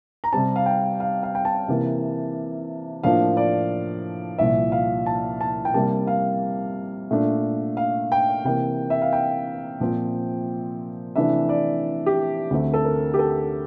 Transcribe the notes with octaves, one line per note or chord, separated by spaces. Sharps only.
A#5
C3 G3 C4 A5
F5
G5
F5
F5
G5
A5
C3 E3 A#3
A2 F3 A#3 D4 F5
D5
C2 A#2 F3 E5
F5
A5
A5
G5
C3 G3 A#3 A5
F5
A#2 A3 D4
F5
G5
C3 E3 A#3 G5
E5
F5
G5
A#2 F3 C4
C3 E3 A3 D4 E5
D5
G4
D2 D3 A3 C4
A4
A#4
G4
A4